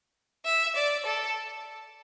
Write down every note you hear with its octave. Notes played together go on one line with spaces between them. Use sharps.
E5
D5
A4